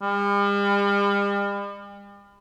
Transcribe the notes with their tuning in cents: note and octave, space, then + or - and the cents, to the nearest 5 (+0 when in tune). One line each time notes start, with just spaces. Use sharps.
G3 +45